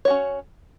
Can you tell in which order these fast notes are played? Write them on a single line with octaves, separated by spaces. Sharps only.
C#5 F#4 C#4